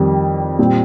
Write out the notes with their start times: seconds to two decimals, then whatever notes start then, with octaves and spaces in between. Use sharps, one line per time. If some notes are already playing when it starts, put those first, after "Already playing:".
Already playing: F2 D#3 G3
0.59 A#2 G3 C4